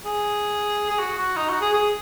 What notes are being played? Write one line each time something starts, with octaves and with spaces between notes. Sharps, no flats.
G#4
G#4
F#4
F#4
D#4
F#4
G#4
G#4